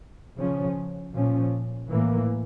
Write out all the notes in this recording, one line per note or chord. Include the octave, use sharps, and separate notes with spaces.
C#3 F3 C#4
A#2 F3 C#4
A2 E3 A#3